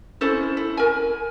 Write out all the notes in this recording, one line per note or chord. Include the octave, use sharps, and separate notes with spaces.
C#4 E4 A4 C5
E4
A#4 G#5